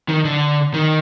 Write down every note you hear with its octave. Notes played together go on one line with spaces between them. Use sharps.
D#3
D3
D#3